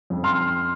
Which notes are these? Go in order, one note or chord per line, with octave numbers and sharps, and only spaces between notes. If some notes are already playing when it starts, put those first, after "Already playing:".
F2
C6 F6